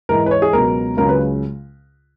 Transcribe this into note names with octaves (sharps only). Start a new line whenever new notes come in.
G#2 E3 G#3 A#4
B4
C#5
G#4
C#2 B2 F#3 A#4
C#2 C#3 F#3 A#4
B4